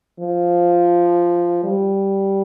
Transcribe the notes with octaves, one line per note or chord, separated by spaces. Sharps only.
F3
G3